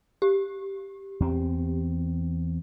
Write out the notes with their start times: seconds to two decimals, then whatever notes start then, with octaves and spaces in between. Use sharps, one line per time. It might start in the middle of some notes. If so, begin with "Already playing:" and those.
0.22 G4
1.20 E2 C4